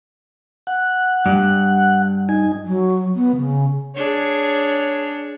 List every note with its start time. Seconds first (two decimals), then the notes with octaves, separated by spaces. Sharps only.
0.67 F#5
1.26 G2
2.29 D#4 G#5
2.64 F#3
3.15 B3
3.36 C#3
3.96 D4 G#4 C#5